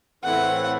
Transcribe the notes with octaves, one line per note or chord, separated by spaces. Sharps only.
A2 E3 A3 C4 E4 F#5